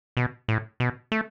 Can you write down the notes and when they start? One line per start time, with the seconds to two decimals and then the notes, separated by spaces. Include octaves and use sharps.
0.17 B2
0.48 A2
0.80 B2
1.12 A3